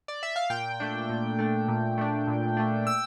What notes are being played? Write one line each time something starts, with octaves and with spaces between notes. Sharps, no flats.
D5
E5
F5
A#2 G5
A3 D4
A#2
A3 D4
A#2
A3 D4
A#2
A3 D4
E6